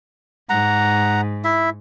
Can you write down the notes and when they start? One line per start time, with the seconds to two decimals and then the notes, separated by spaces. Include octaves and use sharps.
0.49 G#2 F#5 A#5
1.44 E4 E5